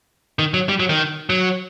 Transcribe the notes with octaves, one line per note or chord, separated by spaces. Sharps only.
D#3
F#3
G3
F#3
D#3
F#3